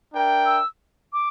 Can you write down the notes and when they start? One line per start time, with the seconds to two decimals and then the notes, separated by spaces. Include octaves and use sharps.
0.13 D4 A#4 E5 G5
0.46 E6
1.13 D6